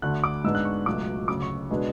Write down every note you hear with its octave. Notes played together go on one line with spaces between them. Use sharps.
D2 D3 A3 F#6
D6
G#2 G#3 B3 D4 E6
F#6
C#6
C#2 B2 F#3 A3 D6
D2 C#3 F#3 D6
C#6
B2 G#3 B3 D4